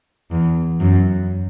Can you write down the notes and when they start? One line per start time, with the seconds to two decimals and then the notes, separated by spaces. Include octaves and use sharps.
0.31 E2
0.80 F#2